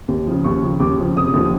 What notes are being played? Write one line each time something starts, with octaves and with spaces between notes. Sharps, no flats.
D#2
C#3 F3
D#2 C#6
C#3 F3
D#2 D6
C#3 F3
F1 D#6
D#2 D3 F3